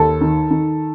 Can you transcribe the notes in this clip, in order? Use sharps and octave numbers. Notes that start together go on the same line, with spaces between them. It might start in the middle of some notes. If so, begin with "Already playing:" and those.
Already playing: D#2 A4
D#3
D#3